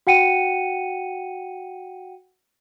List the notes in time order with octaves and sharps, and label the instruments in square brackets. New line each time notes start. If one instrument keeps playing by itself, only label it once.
[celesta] F#4 F#5 G5 C#7 D#7